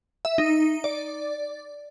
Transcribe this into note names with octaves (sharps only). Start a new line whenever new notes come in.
E5
D#4
D5